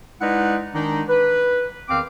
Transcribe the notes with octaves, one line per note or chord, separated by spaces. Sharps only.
G#3 D#4 E4 B4 D5 F#5
D#3 G#3 D4 D#4
B4
E2 D#3 C4 F5 D6